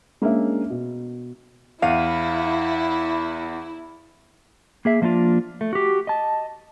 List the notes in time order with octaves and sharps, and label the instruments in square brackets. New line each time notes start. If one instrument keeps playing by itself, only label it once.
[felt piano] G#3 A#3 C#4 D4 E5
B2
[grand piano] E2 [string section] E4 [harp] F5 D#7
[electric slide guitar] A#3 G#4 E5
F3 A#3 D4 D#4 F4
A3
F#4 G4
D#5 A5